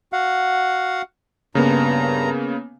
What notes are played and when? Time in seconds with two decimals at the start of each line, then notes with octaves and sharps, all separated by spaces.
0.13 F#4 F5 F#5
1.55 G2 C#3 A#3 B3 A#5